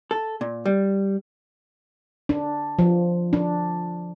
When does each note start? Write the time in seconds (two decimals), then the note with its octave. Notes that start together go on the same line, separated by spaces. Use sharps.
0.11 A4
0.41 A#2
0.66 G3
2.29 D4
2.79 F3
3.33 D4